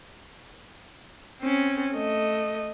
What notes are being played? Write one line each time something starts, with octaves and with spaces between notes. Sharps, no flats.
C4 C#4
A3 D#5